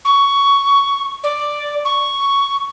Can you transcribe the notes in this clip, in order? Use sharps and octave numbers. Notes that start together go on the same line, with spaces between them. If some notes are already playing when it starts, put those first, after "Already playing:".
C#6
D5
C#6